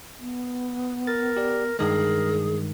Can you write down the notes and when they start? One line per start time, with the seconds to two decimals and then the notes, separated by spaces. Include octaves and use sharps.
0.19 B3
1.07 A#4 A6
1.37 G4 D5
1.79 G2 D#3 G#3 G#4 A#4